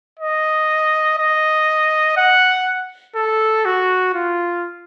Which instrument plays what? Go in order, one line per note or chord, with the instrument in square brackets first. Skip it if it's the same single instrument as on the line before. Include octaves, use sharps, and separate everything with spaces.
[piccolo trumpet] D#5
D#5
F#5
A4
F#4
F4